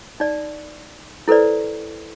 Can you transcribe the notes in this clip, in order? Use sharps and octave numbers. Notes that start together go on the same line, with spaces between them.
D#4 D5
E4 A4 B4 C5 D5